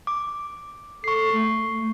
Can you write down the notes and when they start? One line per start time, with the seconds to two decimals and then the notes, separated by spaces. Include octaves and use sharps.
0.07 D6
1.04 A4 C#6 C7
1.32 A3